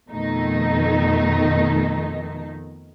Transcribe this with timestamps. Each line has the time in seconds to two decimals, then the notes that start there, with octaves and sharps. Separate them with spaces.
0.10 F2 B2 D#3 A3 D#4